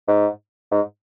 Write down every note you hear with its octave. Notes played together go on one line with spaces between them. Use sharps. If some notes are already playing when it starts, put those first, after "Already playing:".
G#2
G#2